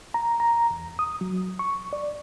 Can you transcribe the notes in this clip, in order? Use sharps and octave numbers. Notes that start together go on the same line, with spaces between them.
A#5
A#5
E2
D#6
F#3
C#6
D5